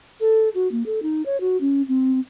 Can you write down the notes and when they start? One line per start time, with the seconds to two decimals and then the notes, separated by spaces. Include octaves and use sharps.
0.20 A4
0.55 F#4
0.71 A#3
0.86 A4
1.02 D#4
1.26 C#5
1.40 F#4
1.61 C#4
1.88 C4